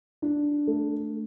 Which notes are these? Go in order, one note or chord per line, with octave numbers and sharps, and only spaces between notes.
D4
A3